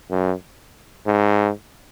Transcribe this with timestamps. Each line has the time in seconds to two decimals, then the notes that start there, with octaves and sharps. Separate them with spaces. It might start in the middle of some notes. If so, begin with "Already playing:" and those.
0.10 F#2
1.06 G#2